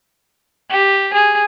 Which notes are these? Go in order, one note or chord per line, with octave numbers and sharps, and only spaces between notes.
G4
G#4